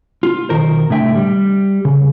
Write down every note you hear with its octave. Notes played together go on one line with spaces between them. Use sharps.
F4
B1 B2 D#3 A#4 C5
C2 A2 D3 E5 G5
G3
C#3